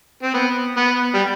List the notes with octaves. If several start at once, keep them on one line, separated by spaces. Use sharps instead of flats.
C4
B3
B3
G3